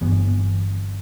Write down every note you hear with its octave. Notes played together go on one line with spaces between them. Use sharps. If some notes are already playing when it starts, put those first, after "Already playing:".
G1 G2 E3 B3